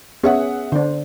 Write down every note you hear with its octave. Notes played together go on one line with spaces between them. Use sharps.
B3 C#4 G#4 E5 F#5
D3 D4 C5